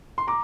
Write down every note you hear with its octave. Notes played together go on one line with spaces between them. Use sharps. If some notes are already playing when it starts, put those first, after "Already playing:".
C6
A#5 D6